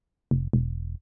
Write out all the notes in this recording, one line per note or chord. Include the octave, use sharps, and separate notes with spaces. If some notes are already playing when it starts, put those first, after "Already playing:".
F1
E1